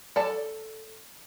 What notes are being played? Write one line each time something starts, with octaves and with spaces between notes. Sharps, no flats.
A4 D5 A5